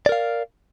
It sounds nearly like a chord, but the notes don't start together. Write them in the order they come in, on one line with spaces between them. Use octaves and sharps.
D5 A#4 F5